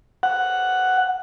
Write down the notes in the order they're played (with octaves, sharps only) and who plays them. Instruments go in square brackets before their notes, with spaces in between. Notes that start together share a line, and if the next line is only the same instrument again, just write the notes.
[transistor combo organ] F#5